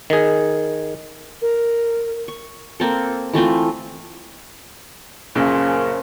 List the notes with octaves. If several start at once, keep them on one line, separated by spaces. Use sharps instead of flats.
D#3 G#4
A#4
C#6
A#3 C4 A4
E3 A3 C4 F4
F#2 A#2 C#3 F3 A#4 G#5
C#4 F4